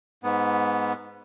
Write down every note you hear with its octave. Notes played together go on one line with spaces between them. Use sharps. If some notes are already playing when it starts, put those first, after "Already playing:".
G#2 B3